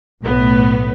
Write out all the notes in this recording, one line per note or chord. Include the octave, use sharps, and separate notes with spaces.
B1 A2 B3